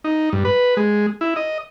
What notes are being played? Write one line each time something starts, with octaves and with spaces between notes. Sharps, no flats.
D#4
G2
B4
G#3
E4
D#5